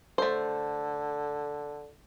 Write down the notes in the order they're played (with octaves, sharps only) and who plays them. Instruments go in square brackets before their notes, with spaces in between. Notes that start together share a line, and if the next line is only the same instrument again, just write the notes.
[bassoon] D3 [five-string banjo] A3 C5